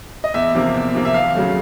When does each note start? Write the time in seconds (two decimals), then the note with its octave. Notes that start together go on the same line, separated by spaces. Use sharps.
0.24 D#5
0.34 E2 E5
0.54 C3 F3 A#3
0.74 E2
0.94 C3 F3 A#3
1.05 E5
1.14 D#2 F5
1.35 C#3 F#3 A3